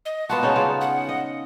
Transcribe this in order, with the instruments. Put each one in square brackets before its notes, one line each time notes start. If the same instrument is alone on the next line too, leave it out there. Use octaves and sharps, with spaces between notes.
[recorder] D#5
[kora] B3 F4 F#4 [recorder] A5
[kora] C#3 C#4 D#4
C#3 F4
[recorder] F#5
[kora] D#5